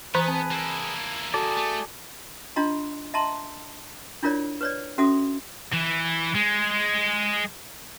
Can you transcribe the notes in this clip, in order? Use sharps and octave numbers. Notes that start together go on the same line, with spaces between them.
E3 B3 G#4 B4 C5 A#5
C4 A5
A#3 E4
F#4 G#4 A4 D5 A5
A3
D4 F4 D#5 A#5 C6
D#5 E5 A5 A#5 C6
D4 E4 F4 A#4 C#5 D5
B4 C#5 D5
C#4 F#4 A4 E5 D#6
E3
G#3